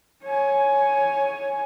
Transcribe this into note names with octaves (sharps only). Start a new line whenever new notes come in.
C#5 G#5